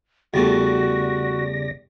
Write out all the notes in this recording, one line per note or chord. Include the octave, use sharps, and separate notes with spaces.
E2 C#3 G3 A3 F#4 D5 A#6